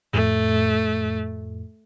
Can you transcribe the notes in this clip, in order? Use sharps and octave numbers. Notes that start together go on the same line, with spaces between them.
F2 A2 A3